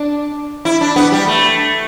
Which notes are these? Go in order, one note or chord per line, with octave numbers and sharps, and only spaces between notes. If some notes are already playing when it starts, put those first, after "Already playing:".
Already playing: D4
E4
D4
B3
G3
A3